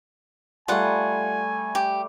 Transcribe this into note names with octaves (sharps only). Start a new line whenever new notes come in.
G3 A3 F4 F#5 G#5
G4